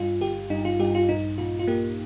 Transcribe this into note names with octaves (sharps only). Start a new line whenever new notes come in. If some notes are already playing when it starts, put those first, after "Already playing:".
Already playing: G2 F4
G1 G4
G2 D#4
F4
G2 G4
F4
A#1 D#4
A#2 F4
F4
A#3 G4